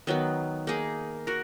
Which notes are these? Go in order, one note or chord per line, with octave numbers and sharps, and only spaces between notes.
D#3 F#3 B3
A#3 D#4 G#4
F#4 A#4